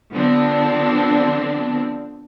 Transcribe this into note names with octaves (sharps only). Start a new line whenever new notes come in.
D3 F3 B3 C4 D4